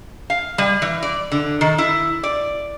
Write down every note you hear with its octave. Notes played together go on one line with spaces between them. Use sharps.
F5
G3
E3
D5
D3
D#3
E4
D5